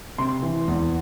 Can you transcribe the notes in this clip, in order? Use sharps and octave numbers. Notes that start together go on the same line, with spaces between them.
C3 C6
E3
E2